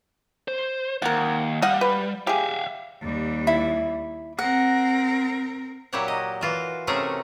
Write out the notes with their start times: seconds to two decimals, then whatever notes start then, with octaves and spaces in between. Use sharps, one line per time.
0.48 C5
1.02 D#2 A#4 F#5
1.62 G3 D#5 F5 F#5
1.81 B4
2.27 G4 G#4 E5 F5
3.01 D#2 G3
3.47 E4
4.39 C4 A#4 F#5
5.93 A#2 F#3 E4 G4 C#5 F#5
6.08 D#5
6.41 E3 F4 F#4
6.87 C3 A3 C#4 E4 G#4 A#4